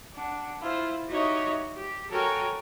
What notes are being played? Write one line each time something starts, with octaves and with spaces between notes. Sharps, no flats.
D4 F#5
E4 F4 C5
D#4 F#4 G4 C#5 D#5 E5
G4
F#4 A4 A#4 C#5 G5 G#5